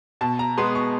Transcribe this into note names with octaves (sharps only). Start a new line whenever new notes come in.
B2 A5
A#5
G#3 B3 C6
C#6